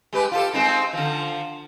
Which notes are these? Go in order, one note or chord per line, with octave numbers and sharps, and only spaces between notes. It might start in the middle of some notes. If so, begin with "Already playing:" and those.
G#3 G4 B4
F4 G4 A4
G#3 C4 D#4
D3 F3